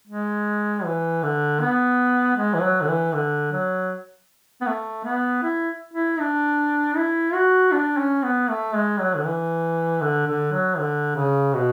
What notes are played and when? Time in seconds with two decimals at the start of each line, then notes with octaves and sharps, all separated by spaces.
0.07 G#3
0.84 E3
1.23 D3
1.61 B3
2.37 G#3
2.54 E3
2.62 F#3
2.81 D3
2.88 E3
3.14 D3
3.52 F#3
4.61 B3
4.67 A3
5.04 B3
5.43 E4
5.93 E4
6.19 D4
6.96 E4
7.34 F#4
7.72 D4
7.97 C#4
8.23 B3
8.49 A3
8.74 G#3
9.00 F#3
9.16 D3
9.25 E3
10.01 D3
10.27 D3
10.52 F#3
10.78 D3
11.16 C#3
11.54 B2